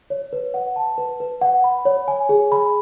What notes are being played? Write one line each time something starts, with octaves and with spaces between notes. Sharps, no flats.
C#5
B4
F#5
A5
B4
B4
F#5
B5
C#5
G#5
G#4
B5